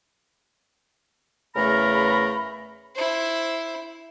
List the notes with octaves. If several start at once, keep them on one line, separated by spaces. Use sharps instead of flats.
E2 C#3 A3 A#4 A#5 B5
E4 C5